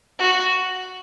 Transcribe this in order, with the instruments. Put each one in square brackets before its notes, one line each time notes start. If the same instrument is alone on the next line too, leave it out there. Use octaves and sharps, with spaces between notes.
[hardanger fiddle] F#4